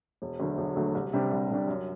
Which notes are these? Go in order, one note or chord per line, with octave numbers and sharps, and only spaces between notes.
E1
D2 D3 F#3 A3
E1
D2 D3 F#3 A3
C2
C3 G3 D4 G4
C2
C3 G3 D4 G4
F#2